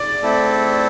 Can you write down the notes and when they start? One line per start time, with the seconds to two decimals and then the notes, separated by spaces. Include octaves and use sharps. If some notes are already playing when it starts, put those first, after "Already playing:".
Already playing: D5
0.23 A3 C4 E4 A4